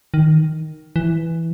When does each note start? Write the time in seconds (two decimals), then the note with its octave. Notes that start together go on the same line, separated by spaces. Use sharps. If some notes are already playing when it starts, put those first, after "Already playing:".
0.14 D#3
0.96 E3